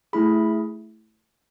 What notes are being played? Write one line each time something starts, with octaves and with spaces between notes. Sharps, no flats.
A3 E4 G#4 B5